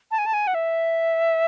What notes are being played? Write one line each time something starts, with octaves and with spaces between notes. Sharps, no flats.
A5
G#5
A5
G#5
F#5
E5